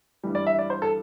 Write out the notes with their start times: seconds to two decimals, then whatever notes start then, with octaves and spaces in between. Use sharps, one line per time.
0.23 G2 E3 G3
0.35 D5
0.47 E5
0.59 D5
0.70 C5
0.82 A4